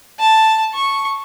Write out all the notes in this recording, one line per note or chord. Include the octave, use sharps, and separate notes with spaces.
A5
C#6